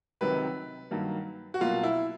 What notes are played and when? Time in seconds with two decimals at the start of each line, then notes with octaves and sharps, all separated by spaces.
0.21 C#2 C3 D#3 F#3 B4
0.91 G2 D#3 F#3 A#3
1.54 F#4
1.61 C2 B2 F#3 A#3 F4
1.83 E4